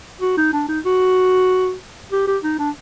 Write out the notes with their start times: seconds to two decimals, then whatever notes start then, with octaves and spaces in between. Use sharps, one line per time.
0.21 F#4
0.37 D#4
0.53 D4
0.68 D#4
0.85 F#4
2.12 G4
2.27 G4
2.43 D#4
2.59 D4